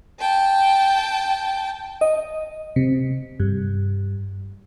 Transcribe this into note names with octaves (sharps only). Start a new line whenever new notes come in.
G5 A5
D#5
C3
G2